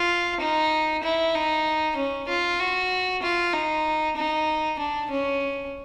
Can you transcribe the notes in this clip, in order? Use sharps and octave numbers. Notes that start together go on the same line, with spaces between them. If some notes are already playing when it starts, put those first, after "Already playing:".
Already playing: F4
D#4
E4
D#4
C#4
F4
F#4
F4
D#4
D#4
D4
C#4